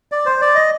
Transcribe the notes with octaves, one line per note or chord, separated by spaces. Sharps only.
D5
C5
D5
D#5